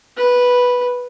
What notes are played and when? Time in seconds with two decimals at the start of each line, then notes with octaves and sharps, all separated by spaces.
0.17 B4